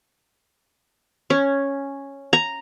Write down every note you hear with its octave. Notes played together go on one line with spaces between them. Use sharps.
C#4
A#5